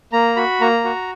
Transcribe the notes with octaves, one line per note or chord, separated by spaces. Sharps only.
A#3 A#5
F#4 B5
A#3 A#5
F#4